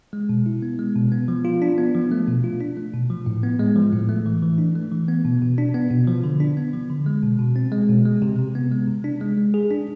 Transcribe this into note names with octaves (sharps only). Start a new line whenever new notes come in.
G#3
B2
E4
B3
G#3
B2
B3
F3
F4
D4
B3
F3
A3
B2
F4
D4
A3
B2
F3
A2
B3
G#3
F3
A2
A3
E3
E3
D4
A3
E3
B3
B2
B2
D4
B3
B2
F3
D3
D4
B3
F3
D3
G#3
B2
B2
C4
G#3
B2
G#3
C3
C3
B3
G#3
C3
D4
G#3
G#3
G#4
D4